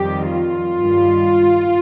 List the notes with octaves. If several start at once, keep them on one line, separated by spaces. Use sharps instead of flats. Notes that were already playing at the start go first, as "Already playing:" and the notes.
Already playing: F2 D#3 G3 G4
F4
G2 D#3 G3